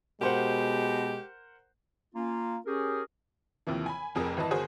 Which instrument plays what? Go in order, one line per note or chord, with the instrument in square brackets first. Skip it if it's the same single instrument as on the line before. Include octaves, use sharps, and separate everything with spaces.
[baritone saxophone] B2 [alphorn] G#3 [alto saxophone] G4 [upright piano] A#4 C5 F#5
[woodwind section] A#3 C#4 F4
C#4 G4 G#4 A#4
[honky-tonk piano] D#2 C3 E3 F3
G#5 B5
F1 F2 G#4 A#4
G#1 E3 B4 D#5 A5
G1 D#3 F#4 G#4 C5